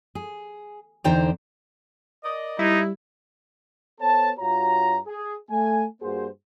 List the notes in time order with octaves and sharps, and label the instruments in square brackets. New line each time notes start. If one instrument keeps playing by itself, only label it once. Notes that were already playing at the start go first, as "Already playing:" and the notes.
[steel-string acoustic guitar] G#4
E2 D3 D#4 C5 G5 A#5
[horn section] A#4 D5 D#5
[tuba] G3 [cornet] D#4 [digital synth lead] E4
[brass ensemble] B3 A4 C5 C#5 A5
G2 F4 F#4 C#5 A#5
G#4
A3 G#5
G2 A#3 F#4 G#4 C5